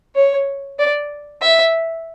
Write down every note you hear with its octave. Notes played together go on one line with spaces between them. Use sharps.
C#5
D5
E5